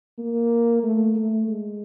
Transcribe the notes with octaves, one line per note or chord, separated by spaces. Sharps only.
A#3
A3
A3
G#3